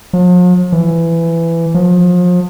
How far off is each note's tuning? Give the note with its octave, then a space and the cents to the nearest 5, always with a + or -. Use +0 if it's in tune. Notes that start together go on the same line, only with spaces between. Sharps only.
F3 +45
E3 +15
F3 +35